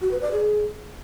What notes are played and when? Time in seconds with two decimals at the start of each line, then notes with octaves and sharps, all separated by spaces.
0.01 F#4
0.11 B4
0.22 D5
0.32 G#4